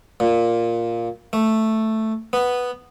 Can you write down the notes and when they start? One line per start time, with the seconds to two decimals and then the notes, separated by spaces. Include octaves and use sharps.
0.20 A#2
1.33 A3
2.33 B3